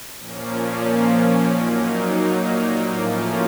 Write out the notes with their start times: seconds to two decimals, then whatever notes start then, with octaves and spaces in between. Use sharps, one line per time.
0.17 A#2 F3 A#3 C#4
1.51 A#2 F#3 A#3 D#4
2.84 A2 F3 A#3 C#4 F4